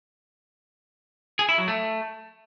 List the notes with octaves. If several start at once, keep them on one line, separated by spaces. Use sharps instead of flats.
G#4
E4
F#3
A3